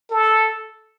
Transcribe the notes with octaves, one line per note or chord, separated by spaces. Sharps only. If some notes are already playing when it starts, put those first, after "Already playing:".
A4